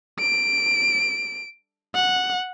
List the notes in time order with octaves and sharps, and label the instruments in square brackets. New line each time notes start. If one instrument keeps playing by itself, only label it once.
[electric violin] D7
F#5